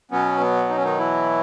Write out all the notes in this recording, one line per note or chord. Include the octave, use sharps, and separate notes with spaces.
B2 F#3 B3 C#4
B3
D#4
C#4
D#3 D#4
E3 E4